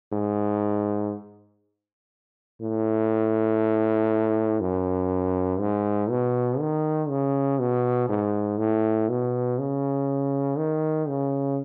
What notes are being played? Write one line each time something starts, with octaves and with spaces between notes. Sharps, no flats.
G#2
A2
F#2
G#2
B2
D#3
C#3
B2
G#2
A2
B2
C#3
D#3
C#3